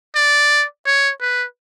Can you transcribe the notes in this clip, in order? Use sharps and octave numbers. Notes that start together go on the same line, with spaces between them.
D5
C#5
B4